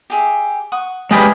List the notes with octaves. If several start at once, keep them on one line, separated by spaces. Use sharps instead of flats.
G4 G#4 E5
F#5 C#6 D#6
G#3 G4 G#4 B4 D5 D#5 F5 B5